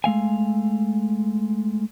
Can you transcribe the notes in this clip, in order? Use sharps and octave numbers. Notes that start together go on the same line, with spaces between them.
G#3 A3 F5 G#5